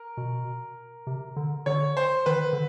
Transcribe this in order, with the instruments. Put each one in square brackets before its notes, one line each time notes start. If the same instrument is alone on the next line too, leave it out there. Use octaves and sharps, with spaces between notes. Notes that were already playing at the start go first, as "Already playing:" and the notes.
Already playing: [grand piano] A#4
[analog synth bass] B2
C3
D3
[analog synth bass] D3 [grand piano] C#5
[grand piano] C5
[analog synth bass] D#3 [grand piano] B4
[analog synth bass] D3